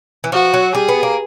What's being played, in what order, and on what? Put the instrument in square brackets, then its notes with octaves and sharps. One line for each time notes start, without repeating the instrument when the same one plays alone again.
[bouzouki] E3
[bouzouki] F3 [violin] F#4
[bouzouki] F#3
[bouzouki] G3 [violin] G#4
[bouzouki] B3
A#3